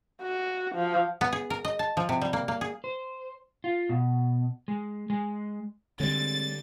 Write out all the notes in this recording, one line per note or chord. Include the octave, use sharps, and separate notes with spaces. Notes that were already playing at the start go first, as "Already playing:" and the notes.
F#4
F3
B3
G#4
A#4
D#5
A5
F3
C3
G3
A#3
A#3
G#4
C5
F4
B2
G#3
G#3
D3 G3 G#3 C4 C#5 A6